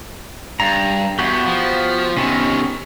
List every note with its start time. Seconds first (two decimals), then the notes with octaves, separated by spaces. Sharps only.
0.60 G2 A#5
1.19 E2 B3 F#4 G4
1.46 F3
2.17 C3 D#3 B3 C#4